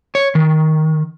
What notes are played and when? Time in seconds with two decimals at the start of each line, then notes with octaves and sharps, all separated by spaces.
0.15 C#5
0.35 D#3